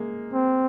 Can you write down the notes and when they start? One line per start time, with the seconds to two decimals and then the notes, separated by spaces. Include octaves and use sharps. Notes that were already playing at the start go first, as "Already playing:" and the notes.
Already playing: G#3 A#3
0.33 C4